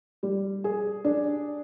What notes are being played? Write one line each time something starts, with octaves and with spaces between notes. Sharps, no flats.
G3
G#4
D4